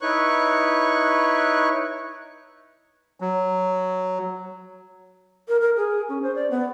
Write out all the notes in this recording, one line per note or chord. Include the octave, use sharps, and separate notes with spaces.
D#4 E4 B4 C#5 C#6 F#6
F#3
A#4
A#4
G#4
C#4
C5
D5
B3